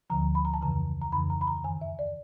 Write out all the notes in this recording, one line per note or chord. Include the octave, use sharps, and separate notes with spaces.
D2 D3 F3 A#5
B5
A#5
A5
F2 C#3 E3 A#5
A#5
F2 C#3 E3 B5
A#5
B5
A#5
F#2 D#3 G#5
E5
D5